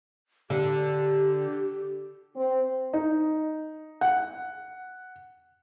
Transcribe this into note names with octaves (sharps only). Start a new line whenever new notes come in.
D3 G4
C4
D#4
F#5